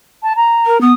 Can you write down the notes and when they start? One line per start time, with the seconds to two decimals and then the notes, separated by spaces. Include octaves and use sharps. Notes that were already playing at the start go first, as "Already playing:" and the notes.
0.23 A5
0.36 A#5
0.66 A#4
0.81 B3 D#6